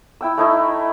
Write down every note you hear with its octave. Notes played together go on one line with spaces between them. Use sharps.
E4 G5 E6
A3 D#4 E4